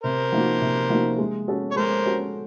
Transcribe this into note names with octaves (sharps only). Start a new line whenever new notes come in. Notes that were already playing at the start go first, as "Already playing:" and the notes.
C3 A#4 C5
F3 A#3 D#4 F#4
C3
F3 A#3 D#4 F#4
G#3
C#4 F#4 A4
C#5
G#3 A#4 C5
C#4 F#4 A4